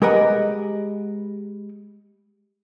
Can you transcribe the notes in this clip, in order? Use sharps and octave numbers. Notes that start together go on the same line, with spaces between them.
G#3 G4 A#4 B4 D#5 F#5